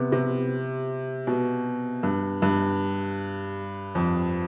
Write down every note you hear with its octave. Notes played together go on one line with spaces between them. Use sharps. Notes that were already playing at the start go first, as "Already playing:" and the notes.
Already playing: C3 B3
C3
B2
G2
G2
F2